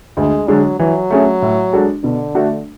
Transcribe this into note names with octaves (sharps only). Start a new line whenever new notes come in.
D2 G#3
D3 F#3 G#3 D4
E3 F#3
A3 C#4 G#4
A2
G#3 D4 F#4 A4
B2 D3
A3 D4 F#4 A4